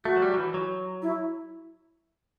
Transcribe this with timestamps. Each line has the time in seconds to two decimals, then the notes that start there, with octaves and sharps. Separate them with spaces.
0.05 A3 F#4
0.16 F#3
0.22 G3
0.34 F#3
0.38 E3
0.54 F#3
1.02 E4